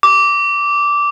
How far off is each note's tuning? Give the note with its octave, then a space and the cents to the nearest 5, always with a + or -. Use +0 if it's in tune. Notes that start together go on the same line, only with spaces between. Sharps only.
D6 -10